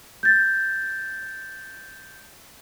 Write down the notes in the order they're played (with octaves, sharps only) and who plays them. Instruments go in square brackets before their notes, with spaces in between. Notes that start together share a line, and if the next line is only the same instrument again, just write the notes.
[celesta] G6 A6